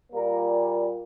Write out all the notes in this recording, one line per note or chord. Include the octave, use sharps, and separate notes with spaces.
A#2 G3 A#3 A#4